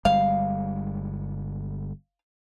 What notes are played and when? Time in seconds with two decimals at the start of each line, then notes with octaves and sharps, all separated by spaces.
0.05 G1 G3 G#3 F5